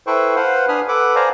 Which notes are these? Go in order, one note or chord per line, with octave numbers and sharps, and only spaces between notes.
E4 A4 B4 C5 G5 C#6
B4 C5 F5 F#5
D4 B4 G#5 B5 D#6 F6
A4 B4 F#5 D6
C5 D5 F5 G#5 A#5